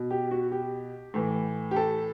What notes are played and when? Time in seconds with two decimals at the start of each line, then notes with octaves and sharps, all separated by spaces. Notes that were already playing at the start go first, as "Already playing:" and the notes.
Already playing: B2
0.11 G4
0.31 F#4
0.52 G4
1.14 A2 E3
1.71 G4
1.76 A4